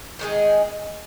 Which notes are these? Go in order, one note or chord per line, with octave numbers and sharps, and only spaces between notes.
D#3 G#3 D#4 G#4